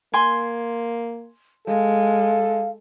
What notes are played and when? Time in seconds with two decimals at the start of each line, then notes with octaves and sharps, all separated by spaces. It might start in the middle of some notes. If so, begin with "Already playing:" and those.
0.14 A#3 G#5 C6
1.67 G#3 A4 F5